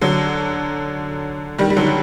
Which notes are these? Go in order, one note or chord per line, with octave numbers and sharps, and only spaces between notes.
D3 F#3
D#3 G3
G3
D3 F#3
F#3